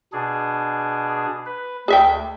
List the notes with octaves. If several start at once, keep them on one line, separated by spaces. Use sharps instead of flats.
B2 D4 G#4
B4
D2 G#4 E5 G5